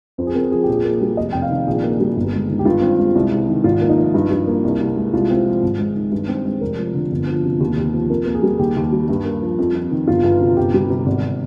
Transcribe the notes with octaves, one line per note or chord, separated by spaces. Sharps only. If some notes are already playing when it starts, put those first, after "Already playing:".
F2 C5
G#4
C4 A#4
F3 G#4
A#1 G4
G#4
A#3
G3
F1 D#5
F1 G5
F5
D#3
A#1 G#4
A#3
G3
G1
G#3
D#3
G4
G2 F4
C4
G#3
C2
C2
D#3
G#1 F4
A#3
D#4
F3
G2
G2
A#3
C2
C2
G#3
C2 F4
C4
F3
G#1
G#3
D#3
G2
C4
G#3
F1 A#4
F3
D3
G1
F3
C3
D#2
D#2
F3
F2 A#4
A#3
G#4
G3
D#2 G4
D#2
G3
G2
A#3
F3
F2
F2
D#3
G1 F4
G1
C3
G1 G4
G3
C3
G#1